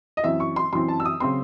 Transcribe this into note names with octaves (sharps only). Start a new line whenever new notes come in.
D#5
F#2 E3 C4 E5
C#6
C6
F#2 E3 C4 C6
A5
E6
D#6
C#3 F#3 C4 C6